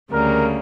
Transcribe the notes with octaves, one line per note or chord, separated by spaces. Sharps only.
D2 C#3 G3 A#3 A#4